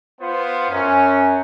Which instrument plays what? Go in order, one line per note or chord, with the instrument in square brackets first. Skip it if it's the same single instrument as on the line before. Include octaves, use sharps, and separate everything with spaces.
[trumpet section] B3 F4 C5
[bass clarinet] F#2 [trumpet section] C#4